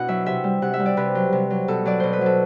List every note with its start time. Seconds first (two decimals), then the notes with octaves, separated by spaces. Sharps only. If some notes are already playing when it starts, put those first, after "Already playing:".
Already playing: B2 D4 E4 F#4 F#5
0.08 F#3 E5
0.26 C3 E5
0.44 G3
0.62 C3 F#5
0.73 E5
0.80 G3
0.86 D5
0.97 C3 B4
1.15 F#3
1.33 C3
1.51 F#3
1.68 B2 A4
1.85 F#3 D5
2.00 B2 C5
2.13 B4
2.21 F#3 A4